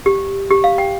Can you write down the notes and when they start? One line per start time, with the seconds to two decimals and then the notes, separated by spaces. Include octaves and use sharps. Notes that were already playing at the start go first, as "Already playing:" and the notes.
0.06 G4
0.51 G4
0.64 F5
0.78 G5